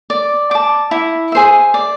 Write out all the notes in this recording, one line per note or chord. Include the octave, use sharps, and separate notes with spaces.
D5
A5 D6
E4
G#4 C5 E5
D5